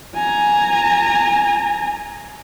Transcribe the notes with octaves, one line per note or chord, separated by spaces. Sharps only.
G#5 A#5